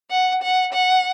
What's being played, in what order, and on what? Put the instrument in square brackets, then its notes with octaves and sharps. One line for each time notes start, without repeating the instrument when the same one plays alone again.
[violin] F#5
F#5
F#5